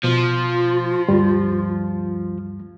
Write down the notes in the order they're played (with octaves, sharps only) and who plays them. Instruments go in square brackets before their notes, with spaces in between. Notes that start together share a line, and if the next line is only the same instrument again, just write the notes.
[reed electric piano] B2 [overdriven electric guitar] F3 [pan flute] F4
[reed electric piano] D2 G2 G3